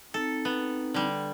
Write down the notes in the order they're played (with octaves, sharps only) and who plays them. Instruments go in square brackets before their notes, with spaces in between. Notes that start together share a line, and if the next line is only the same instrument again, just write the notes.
[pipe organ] C4 D#4 [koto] A4
[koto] B3
D3 G3